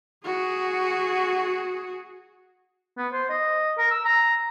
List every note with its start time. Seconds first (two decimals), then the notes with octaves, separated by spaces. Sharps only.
0.24 F#4 G#4
2.98 B3
3.13 C5
3.30 D#5
3.78 A#4
3.91 E6
4.05 A#5